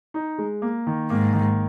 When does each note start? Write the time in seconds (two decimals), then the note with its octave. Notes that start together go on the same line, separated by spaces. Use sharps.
0.14 D#4
0.38 G#3
0.62 A#3
0.87 D#3
1.10 G#2 A#3
1.33 D#3